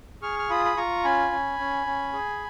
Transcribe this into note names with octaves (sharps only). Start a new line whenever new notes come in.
G#4 C#6 F6
F6
F4 B5 D#6
B5
F4 A#5 C#6
C#4 G#5 B5
C#4
C#4
C#4
G#4